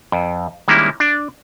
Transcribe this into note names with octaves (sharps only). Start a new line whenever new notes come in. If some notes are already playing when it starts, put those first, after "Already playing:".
F2
D#3 G3 G#3 A#3 C#4 E4
D4